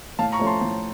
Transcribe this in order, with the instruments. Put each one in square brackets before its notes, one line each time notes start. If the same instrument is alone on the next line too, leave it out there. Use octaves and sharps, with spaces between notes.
[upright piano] A2 [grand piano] F5 A5
[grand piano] A#5 C#6
[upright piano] F3 A3 C#4
[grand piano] A5 C6
[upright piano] A2